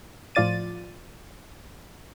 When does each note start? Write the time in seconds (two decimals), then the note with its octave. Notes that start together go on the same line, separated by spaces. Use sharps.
0.35 A2 F3 F4 D5 A6 D#7